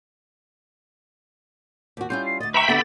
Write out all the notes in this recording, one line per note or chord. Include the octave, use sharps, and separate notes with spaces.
D#2 F#4
G3 C#4 E4 F4 G6
C7
D2 D#5 A6
B4 E5 G5 A#5 B5 C#6 E7
D3 B3 F#4 G4 F#5 A6